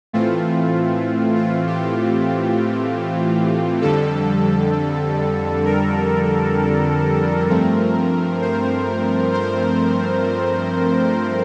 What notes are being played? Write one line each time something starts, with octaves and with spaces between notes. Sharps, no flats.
A2 E3 A3 C4 F4
F4
G4
F2 D3 G3 A4
A#4
G2 F3 A3 C4
C5
C5